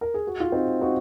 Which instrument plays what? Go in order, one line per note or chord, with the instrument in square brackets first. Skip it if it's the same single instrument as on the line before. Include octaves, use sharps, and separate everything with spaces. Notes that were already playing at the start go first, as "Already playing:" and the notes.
[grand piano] A#4
G#4
F#4
F4
C4 D#4
D#4 F#4